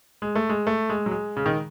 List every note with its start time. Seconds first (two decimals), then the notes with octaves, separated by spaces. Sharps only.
0.22 G#3
0.35 A3
0.49 G#3
0.67 A3
0.90 G#3
1.06 F#3
1.11 G#3
1.37 C#3
1.46 D#3